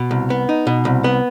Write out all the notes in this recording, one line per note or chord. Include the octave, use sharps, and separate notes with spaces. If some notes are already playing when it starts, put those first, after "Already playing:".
Already playing: B2
C2
B3
D#4
B2
C2
B3